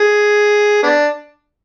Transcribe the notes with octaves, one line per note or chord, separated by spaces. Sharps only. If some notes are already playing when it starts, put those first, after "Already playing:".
Already playing: G#4
B3 D4